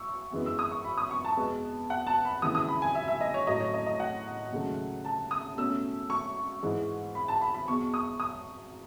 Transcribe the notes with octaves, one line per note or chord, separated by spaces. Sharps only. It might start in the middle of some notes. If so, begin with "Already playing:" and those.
Already playing: C#6 E6
F#2 E3 G#3 B3
E6
D#6
C#6
B5
D#6
C#6
A5
E2 B2 G#3 B3
F#5
A5
B5
D#2 C#3 E3 D#6
D#6
B5
G#5
E5
E5
D#5
C#5
A2 F#3 A3 D#5
C#5
D#5
D#5
F#5
D#2 C#3 F#3 A3
A5
D#6
B2 A3 C#4 E6
C#6
G#2 E3 G#3
B5
A5
B5
B5
E2 B2 G#3 C#6
D#6
D#6